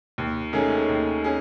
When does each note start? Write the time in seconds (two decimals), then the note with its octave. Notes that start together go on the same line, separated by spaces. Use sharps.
0.18 D#2
0.53 D#3 A3 C#4 G#4
0.89 D#2
1.24 C#4 G#4